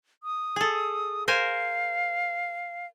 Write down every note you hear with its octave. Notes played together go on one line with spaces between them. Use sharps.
D#6
G#4 A4
A#4 C5 F5 G#5